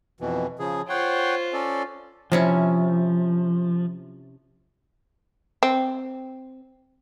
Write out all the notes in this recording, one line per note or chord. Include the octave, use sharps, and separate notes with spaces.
F2 B2 E3
C#3 F3 G#4
F4 C5 C#5 F#5 G5
C#4 A4 D5
C3 F3 C#4 E4
C4